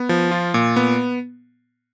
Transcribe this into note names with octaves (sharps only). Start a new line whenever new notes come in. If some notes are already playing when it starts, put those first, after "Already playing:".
Already playing: B3
F3
F4
A#2
B3